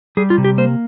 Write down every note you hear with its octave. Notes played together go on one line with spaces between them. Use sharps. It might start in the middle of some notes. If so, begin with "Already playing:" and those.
G3 G#4
F4
C3
G4
A#3 C5